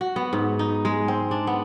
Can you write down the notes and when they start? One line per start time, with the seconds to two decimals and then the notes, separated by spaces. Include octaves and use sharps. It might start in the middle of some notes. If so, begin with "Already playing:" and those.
0.01 F#4
0.16 B3
0.33 G#2
0.59 D#4
0.85 G#3
1.08 C4
1.31 D4
1.47 B3